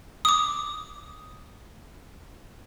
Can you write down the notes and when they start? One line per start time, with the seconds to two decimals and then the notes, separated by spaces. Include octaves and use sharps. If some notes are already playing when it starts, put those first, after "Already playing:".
0.25 D6 D#6